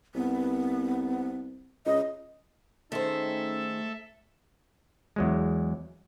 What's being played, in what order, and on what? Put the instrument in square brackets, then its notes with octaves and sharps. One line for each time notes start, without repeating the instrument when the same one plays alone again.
[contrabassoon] C2 [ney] B3
[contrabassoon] C#2 [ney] D#5
[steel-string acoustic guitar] D#3 G#4 C5 [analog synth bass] A3 [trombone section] C#4 D#4 [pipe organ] A4 E5
[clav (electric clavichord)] E2 F#3 G#3